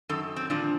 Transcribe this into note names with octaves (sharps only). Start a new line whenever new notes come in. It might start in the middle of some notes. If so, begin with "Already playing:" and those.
F#2 D#3 A4
C4
A#2 F3 D4